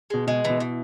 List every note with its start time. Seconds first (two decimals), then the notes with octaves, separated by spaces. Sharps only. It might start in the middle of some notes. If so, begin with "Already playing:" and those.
0.10 B2 G#3
0.27 B2 G#3
0.45 B2 E3
0.60 E3